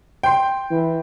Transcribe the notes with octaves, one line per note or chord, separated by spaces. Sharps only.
G5 C6
E3